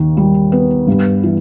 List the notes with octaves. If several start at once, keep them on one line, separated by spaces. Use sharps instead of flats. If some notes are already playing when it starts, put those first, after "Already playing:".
Already playing: D#2 D#3
G3
B3
G2
E3